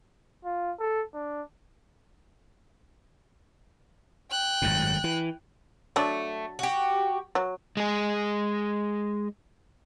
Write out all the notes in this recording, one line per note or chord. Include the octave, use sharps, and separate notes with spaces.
F4
A4
D4
G5 F#6
G#1 F#2 A2
E3
F#3 A3 D4
F#4 G4
F#3
G#3 G#4